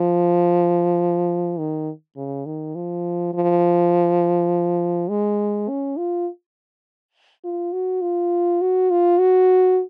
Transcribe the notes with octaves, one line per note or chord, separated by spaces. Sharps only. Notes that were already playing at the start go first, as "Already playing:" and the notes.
Already playing: F3
D#3
C#3
D#3
F3
F3
G#3
C#4
F4
F4
F#4
F4
F#4
F4
F#4